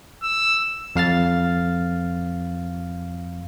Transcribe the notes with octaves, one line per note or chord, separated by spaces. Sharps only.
E6
F2 F5 F6 A6